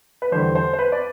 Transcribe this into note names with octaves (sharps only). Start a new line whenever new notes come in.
B4
E2 D3 G3 C5
C5
C5
B4
D5